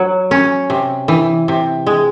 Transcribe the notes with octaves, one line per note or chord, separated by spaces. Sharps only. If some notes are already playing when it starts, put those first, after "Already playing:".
Already playing: F#3
C#4
C3
E3
C3
G#3